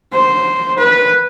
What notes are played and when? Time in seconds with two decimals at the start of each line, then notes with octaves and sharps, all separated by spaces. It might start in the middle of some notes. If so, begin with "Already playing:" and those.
0.13 C5
0.79 B4